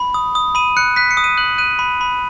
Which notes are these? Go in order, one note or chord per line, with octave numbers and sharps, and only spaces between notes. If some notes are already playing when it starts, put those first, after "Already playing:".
Already playing: B5
D#6
D#6
B5 D#7
F#6 C#7
F#6 B6
C#7
D#6
D#7
F#6 F#7
F#6 D#7
B5
B5